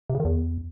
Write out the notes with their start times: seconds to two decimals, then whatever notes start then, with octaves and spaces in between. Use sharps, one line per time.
0.10 C3
0.15 C#3
0.20 D#3
0.25 E2